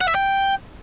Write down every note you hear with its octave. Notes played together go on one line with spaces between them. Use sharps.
F#5
E5
G5